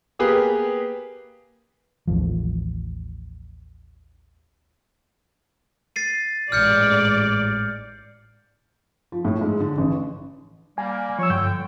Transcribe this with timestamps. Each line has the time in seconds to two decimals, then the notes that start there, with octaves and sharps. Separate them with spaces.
0.19 A#3 B3 G4 G#4 B4
2.07 A1 D#2 F3
5.96 A6 C7 D#7
6.52 A1 G#2 D5 F6 G6 C#7
9.12 F3
9.25 A2
9.41 G#2
9.60 D3
9.78 A1
10.78 G3 A#3 G#5
11.19 F3 C#5 E6
11.30 G2 D3 G5 G6